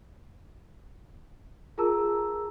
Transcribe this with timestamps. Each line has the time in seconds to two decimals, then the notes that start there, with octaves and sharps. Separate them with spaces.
1.78 F4 G#4 A#4 A5 A#5 E6